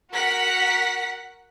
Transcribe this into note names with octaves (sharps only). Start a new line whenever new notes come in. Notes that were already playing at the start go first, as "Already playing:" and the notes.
F#4 A#4 F#5 B6